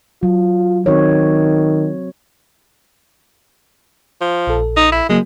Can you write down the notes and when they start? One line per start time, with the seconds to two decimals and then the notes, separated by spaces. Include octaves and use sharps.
0.23 F#3 F4
0.86 D#3 C4 F#4 C#5
4.21 F3
4.47 A#1 A4
4.77 D#4
4.92 E4
5.09 C#3 F#3 G#3 A#3